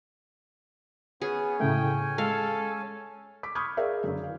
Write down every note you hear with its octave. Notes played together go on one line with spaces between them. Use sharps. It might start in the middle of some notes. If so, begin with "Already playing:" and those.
B3 C#4 G#4 C#5 G#5
A2 C#3 A3 G5
G#3 A4 F5
D6 B6
B5 C#6 D#6 F6 G6 G#6
G#4 A#4 D5 E5 F5
F#2 D3
E3 F5